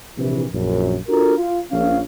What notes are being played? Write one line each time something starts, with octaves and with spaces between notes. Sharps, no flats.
A#1 C3 E3
A#1 F#2
D4 F4 F#4 A4 A#4
F4
A#1 C#4 C#5 F5